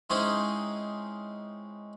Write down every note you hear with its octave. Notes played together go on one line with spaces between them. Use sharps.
G#3 C4 C#4 D#4 E4